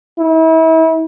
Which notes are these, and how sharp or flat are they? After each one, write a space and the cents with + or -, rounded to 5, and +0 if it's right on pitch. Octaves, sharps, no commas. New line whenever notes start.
E4 -35